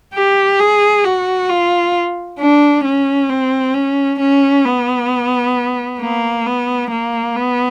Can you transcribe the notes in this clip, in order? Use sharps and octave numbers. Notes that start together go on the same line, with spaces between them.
G4
G#4
F#4
F4
D4
C#4
C4
C#4
C#4
B3
A#3
B3
A#3
B3